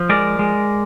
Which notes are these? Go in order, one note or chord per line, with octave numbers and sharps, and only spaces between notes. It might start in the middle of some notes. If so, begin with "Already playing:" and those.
Already playing: F3
G#3 A#4 D5
G#3